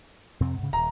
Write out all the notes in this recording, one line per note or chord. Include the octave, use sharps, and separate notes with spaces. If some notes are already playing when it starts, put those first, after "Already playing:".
F2 C3 C4
G#2 C#3
D#1 A#5